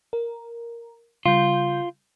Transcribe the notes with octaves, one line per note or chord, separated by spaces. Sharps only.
A#4
C#3 G3 F4 G6